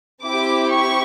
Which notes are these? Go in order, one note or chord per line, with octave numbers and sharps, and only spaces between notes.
C4 E4 G4 D6
C#6